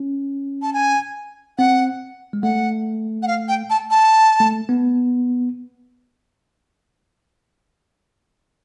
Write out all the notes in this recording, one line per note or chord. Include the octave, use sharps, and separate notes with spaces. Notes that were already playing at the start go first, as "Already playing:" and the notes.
Already playing: C#4
A5
G#5
C4 F#5
G#3
A3 F#5
F#5
F5
G5
A5
A5
A3
B3